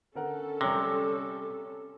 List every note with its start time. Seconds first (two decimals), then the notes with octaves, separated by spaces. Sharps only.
0.15 D3 C#4 A4 A#4 F#5
0.61 C3 G3 C#5 A#6